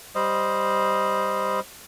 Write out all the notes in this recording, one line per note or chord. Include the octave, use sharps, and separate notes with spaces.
G3 C5 D#5